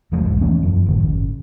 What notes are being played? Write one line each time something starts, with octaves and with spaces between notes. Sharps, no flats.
E2 C#3 F3 A3
E1 C2 G#2
E3 A3 B3 C#4
F#2 F3
G1 C#2 A2 D#3
G1 C#3